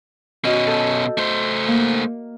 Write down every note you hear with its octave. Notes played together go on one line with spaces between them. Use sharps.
B2 C#4 F#4 D#5
A4 G6
A3 C5
A#3